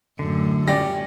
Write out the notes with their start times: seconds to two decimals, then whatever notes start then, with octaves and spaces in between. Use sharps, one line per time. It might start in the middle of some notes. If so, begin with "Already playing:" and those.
0.19 F#2 A2 D3
0.68 G3 C#4 D5 A#6